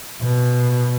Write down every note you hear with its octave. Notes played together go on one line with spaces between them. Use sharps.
B2